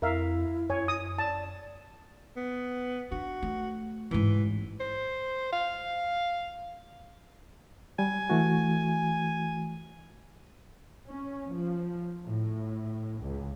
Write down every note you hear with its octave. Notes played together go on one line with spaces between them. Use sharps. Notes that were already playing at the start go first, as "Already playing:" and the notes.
F2 E4 A#4 E5 F5
F#2 C#5 G#5
D#6
D5 A5
B3
D4 F#4
A3
A1 G#2 E3
C5
F5
G3 G#5
E3 A3 F#4
C#4
F3
A2
C#2